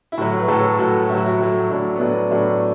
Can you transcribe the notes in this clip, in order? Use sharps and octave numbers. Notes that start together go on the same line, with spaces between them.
E4
A2 F#3 F#4
B4
A2 F#3 A4
A2 F#3 F#4
A2 E4
F#3 F#4
E4
A2 F#3
A2 F#3 D4
B3
A2 F#3 D4
A2 F#3 D4